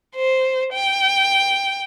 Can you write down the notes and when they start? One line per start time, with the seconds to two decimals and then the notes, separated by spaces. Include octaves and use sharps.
0.16 C5
0.73 G5